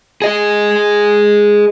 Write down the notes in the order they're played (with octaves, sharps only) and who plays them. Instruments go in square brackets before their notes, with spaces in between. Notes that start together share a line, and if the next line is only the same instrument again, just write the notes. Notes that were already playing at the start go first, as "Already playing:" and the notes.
[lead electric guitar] G#4 D#5